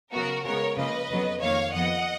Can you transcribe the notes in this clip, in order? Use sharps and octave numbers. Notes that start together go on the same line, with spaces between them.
C#3 F#3 B3 F#4 A#4
C#3 G#3 B3 A#4 C#5
C#3 F3 A#3 B4 D#5
F2 C#3 F#3 B3
F2 D#3 F#3 A#3 C#5 F5
F2 F3 B3 D#5 F#5